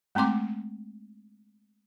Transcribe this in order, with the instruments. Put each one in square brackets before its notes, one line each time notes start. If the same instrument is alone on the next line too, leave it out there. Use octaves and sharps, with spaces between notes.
[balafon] G#3 A3 C4 C6 D6